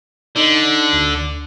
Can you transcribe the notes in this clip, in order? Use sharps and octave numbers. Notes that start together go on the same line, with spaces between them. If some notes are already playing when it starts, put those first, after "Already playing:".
D3 D#4
D2